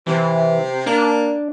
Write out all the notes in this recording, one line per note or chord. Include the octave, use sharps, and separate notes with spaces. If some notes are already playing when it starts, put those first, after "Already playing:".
C3 E3
A#3 D4